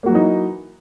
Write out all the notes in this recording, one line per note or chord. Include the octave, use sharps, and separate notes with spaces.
E3 F#3 A#3 D#4 F#4